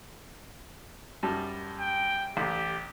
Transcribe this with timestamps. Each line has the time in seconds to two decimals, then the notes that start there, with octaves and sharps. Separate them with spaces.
1.23 F#2 G3 A5
1.80 G5
2.37 A1 G4